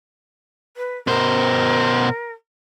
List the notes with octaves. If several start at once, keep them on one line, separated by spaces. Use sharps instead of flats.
B4
B2 A#4 C5